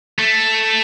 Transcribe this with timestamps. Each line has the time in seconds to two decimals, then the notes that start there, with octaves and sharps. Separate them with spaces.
0.19 A3